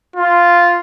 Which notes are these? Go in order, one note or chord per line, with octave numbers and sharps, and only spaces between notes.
F4